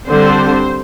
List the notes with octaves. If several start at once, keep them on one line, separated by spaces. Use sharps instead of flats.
D3 G3 C4 C5